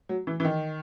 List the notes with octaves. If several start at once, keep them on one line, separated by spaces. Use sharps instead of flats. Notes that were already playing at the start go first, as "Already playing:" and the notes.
F#3
E3
E3
D#3